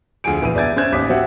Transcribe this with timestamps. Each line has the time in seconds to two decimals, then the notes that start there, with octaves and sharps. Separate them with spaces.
0.24 D2 F3 G#4 G#5 D7
0.41 A#1 E3 B4 D#7
0.55 G1 D5 E5 G#6 A6
0.76 C#4 C5 E5 F#6 G#6 E7
0.92 A1 D#2 D6 B6
1.10 F#3 C4 G4 E5 F#5